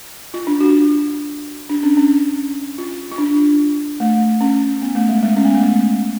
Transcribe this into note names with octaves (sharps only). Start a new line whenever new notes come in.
F4
D4
F#4
D4
C#4
C#4
F4
F4
D4
A3
C#4
B3
A3
G#3
G#3
C#4
B3
A3
G#3